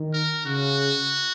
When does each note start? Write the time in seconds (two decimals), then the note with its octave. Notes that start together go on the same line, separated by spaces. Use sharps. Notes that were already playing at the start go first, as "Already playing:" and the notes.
Already playing: D#3
0.13 A#4
0.46 C#3 F#4